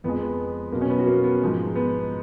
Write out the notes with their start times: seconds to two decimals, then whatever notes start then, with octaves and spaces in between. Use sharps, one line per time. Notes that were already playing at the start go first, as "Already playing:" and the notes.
0.04 F2 F3 G#3 B3
0.21 B3
0.72 B2 F#3 A#3
0.81 C#4
0.90 B3
0.99 F#4
1.07 A#3
1.24 B3
1.42 G#2 F3 G#3
1.75 B3